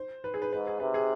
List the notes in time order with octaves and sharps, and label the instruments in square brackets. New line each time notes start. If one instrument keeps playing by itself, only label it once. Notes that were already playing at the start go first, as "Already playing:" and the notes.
Already playing: [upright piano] C5
B4
G#4
B4
[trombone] G#2 [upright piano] B4
[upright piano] G#4
[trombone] C3 [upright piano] B4
[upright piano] G#4